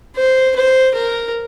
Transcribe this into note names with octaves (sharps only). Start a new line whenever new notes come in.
C5
C5
A#4